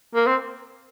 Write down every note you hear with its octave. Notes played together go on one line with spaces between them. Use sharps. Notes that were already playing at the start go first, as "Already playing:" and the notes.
A#3
C4